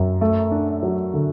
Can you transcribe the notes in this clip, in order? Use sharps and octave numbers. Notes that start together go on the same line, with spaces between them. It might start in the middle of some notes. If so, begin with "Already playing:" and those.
Already playing: F#2
A3
D4
F#3
D3